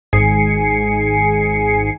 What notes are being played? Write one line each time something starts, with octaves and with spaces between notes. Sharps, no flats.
G#1 G#2 G#4 G#5 C7 C#7